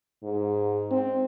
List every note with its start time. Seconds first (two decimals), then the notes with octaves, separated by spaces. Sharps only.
0.23 G#2
0.91 C4